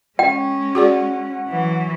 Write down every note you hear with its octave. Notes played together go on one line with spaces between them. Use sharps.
G#3 C#4 G5
F#4 G#4 D5 F#5
E3 F#3